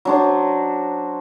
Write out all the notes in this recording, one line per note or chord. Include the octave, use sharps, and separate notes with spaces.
F#3 D4 C5